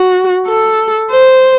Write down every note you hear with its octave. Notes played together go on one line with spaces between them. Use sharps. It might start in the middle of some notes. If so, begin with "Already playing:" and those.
Already playing: F#4
A4
C5